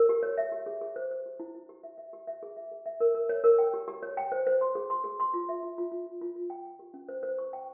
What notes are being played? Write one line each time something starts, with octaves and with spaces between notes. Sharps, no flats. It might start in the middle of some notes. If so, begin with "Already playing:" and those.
Already playing: A#4
G4
C#5
E5
G4
G#4
G#4
C5
C5
G4
E4
E4
G4
E5
E5
G4
E5
G#4
E5
G#4
E5
A#4
A#4
C#5
A#4
G5
G4
G4
C#5
G5
C5
C5
C6
G#4
C6
G#4
C6
F4
E5
F4
F4
F4
F4
F4
F4
G5
G5
G4
C#4
C5
C5
C#6
G5